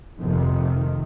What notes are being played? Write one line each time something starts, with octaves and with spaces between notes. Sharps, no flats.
F1 F2 C3 D#3